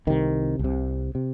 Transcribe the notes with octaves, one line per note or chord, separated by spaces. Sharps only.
C2 C3 D#3
C2
C3
C3